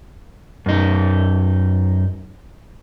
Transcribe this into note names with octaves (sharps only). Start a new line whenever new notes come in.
F#2 D#4